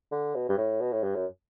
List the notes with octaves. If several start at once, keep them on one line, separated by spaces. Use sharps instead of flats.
D3
B2
G2
A2
B2
A2
G2
F#2